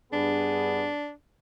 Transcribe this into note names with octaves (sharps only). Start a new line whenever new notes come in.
G2 B3 D4 G#4